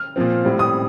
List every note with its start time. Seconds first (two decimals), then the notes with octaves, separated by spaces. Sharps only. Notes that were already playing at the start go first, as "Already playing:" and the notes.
Already playing: F6
0.16 A#2 F3 C4
0.45 A2 G3 C4
0.59 D#6